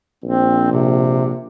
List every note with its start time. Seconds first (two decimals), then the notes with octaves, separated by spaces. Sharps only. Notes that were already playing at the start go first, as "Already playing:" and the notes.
0.24 A#1 C4
0.71 C3